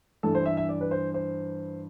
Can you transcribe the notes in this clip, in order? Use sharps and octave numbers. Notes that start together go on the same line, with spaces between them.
G2 E3 A4
C5
E5
E5
D5
B4
C5
C5